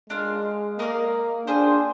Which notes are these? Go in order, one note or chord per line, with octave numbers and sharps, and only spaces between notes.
G#3 D4 F4 A#4 F5
A#3 D#4 A#4 D5 F5
D4 F4 G#4 C5 G5